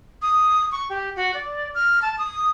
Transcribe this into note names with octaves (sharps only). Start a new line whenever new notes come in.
D#6
C#6
G4
F#4
D5
F6
A5
D#6